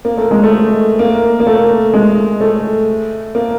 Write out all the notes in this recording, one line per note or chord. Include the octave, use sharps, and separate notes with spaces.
A#3
A3
G#3
A3
A#3
A#3
A3
G#3
A3
A#3